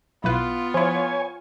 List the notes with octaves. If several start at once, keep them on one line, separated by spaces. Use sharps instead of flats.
B1 B3 E4 F4 B4
F3 E4 C#5 G#5